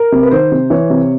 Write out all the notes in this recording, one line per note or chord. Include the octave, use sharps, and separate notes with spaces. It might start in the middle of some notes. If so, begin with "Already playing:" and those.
Already playing: A#4
C3
B4
D#3 C5
C3
E3 C#5
C3